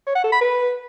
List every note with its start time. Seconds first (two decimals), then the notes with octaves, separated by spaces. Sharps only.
0.07 C#5
0.15 F#5
0.24 A4
0.32 B5
0.41 B4